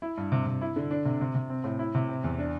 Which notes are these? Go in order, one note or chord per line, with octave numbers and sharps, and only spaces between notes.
E4
G2
C3
C3
E4
D3
D4
C3
C3
C3
C4
A2
E4
C3
C4
E2
D4